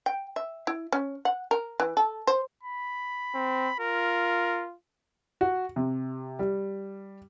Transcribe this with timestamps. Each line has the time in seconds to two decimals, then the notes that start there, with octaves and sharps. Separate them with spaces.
0.06 G5
0.36 E5
0.67 E4
0.93 C#4
1.25 F#5
1.51 A#4
1.80 E3
1.97 A4
2.27 C5
2.63 B5
3.35 C4
3.79 F4 A#4
5.41 F#4
5.76 C3
6.39 G3